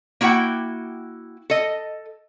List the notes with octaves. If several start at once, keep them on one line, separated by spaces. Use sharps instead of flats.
A#3 E4 F#4 F#5 G5
A4 D#5